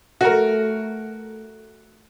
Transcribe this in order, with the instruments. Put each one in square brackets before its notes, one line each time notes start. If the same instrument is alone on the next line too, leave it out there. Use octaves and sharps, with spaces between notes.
[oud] A3 [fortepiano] F#4 A#4